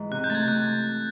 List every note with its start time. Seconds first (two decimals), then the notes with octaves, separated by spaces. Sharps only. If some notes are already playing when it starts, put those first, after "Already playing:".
Already playing: G#2 E3
0.11 C3 F#6
0.24 G6
0.30 A3 G#6 A6
0.48 C3 F#6